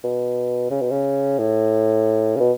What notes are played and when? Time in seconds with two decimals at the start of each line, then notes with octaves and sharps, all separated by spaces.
0.04 B2
0.70 C#3
0.81 B2
0.91 C#3
1.38 A2
2.36 C#3
2.40 B2